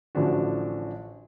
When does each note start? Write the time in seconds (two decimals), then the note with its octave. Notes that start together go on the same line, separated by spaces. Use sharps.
0.15 A1 D3 F3 D4 F#4